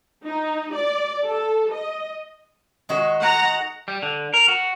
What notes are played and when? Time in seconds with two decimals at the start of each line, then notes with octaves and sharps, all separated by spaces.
0.24 D#4
0.74 D5
1.25 A4
1.74 D#5
2.89 D#3 G#3 F#4
3.20 F#5 A#5
3.88 G3
4.03 D3
4.34 A#4
4.48 F#4